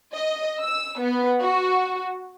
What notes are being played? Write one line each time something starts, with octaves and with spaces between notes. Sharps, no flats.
D#5
E6
B3
F#4